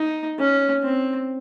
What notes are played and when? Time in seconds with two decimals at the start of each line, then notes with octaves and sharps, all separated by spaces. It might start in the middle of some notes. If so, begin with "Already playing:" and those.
Already playing: D#4
0.39 C#4
0.83 C4